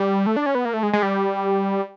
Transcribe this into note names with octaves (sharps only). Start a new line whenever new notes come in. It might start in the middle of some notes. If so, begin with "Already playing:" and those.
Already playing: G3
A3
D4
C#4
B3
A#3
A3
G#3
G#3
G3